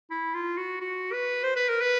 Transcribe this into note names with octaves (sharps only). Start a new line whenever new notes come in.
E4
F4
F#4
F#4
B4
C5
B4
A#4
B4